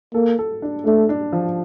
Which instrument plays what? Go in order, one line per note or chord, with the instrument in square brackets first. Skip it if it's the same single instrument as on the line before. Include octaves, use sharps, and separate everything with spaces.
[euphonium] A#3 [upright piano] A4
[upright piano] A4
D4
[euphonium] A3 [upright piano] D4
[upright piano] D4
F3